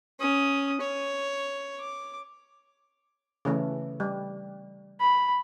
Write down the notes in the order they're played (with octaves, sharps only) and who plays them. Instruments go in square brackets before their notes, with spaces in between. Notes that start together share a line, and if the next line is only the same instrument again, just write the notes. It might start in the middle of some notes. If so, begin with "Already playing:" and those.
[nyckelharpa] C#4 D#6
C#5
D6
[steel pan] C#3 E3 A3
G3
[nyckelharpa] B5